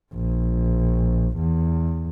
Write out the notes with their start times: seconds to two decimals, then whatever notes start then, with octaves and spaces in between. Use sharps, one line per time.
0.14 A#1
1.37 E2